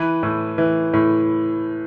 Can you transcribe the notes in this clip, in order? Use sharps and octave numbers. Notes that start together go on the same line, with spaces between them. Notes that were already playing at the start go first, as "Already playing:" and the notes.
Already playing: E3 B4
A2
E3
A2